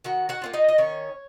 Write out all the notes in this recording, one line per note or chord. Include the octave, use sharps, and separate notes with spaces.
D#3 F#4 F#5
F#4 F#5
A#3 C#4 F4
D#4 D#5
D#5
D#3 C#4 C#5